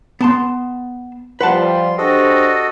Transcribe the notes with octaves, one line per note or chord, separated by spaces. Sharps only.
B3 A5 C6
F3 G3 F4 B4 F#5 A5 C6
D4 F#4 G4 A4 C5 D#5